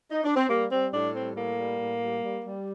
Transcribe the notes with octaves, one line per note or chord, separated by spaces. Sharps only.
D#4
D4
C4
G3 A#3
G3 C4
A2 D4
G3 C4
A2 A#3
G3
A2
G3
G3
G3